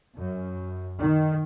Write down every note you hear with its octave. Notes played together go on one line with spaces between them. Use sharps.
F#2
D#3